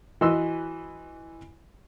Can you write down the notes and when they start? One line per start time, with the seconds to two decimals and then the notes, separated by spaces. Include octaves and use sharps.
0.21 E3 F#4 B4 D#5 C6 E6